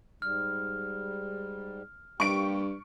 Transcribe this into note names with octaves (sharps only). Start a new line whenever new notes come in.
G#2 G3 F6
G2 A#3 G4 G5 C#6 D7